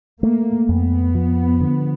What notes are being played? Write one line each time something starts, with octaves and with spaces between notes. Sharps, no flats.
A3 A#3
F2 B3
F3
D3